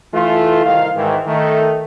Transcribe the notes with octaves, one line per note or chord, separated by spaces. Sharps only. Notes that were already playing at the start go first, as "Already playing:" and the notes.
E3 A3 F4
C2 D#3 F5
G#2 D#3 E3
D#3 A3 D#4